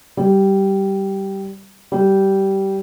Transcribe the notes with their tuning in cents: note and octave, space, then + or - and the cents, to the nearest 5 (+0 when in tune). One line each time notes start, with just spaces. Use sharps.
G3 -10
G3 -15